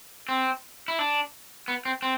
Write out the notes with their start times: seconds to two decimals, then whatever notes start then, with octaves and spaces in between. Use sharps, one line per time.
0.29 C4
0.88 E4
0.99 D4
1.68 B3
1.85 C4
2.02 C4